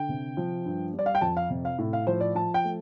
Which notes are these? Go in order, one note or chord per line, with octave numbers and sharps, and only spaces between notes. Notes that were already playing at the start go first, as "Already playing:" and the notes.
Already playing: D3 G5
C3
F3
G2
G3
D5
F5
G5
F2 A5
F5
C3
F5
A2
F5
F3 C5
D5
F3 A5
G5
A3